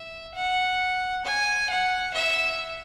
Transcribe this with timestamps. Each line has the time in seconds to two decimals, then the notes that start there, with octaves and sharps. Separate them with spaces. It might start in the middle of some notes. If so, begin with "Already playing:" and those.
Already playing: E5
0.35 F#5
1.25 G#5
1.70 F#5
2.14 E5